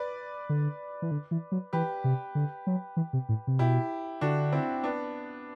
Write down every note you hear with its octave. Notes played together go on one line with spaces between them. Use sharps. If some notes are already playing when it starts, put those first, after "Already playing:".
Already playing: B4 D5
D3
E3
D3
E3
F#3
E3 G4 B4
C3
D3
F#3
E3
C3
A2
C3
B2 E4 G4
D3 D4 F#4
C4 E4
B3 D4